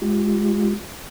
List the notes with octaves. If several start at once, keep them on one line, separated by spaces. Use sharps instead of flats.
G#3 F4 G4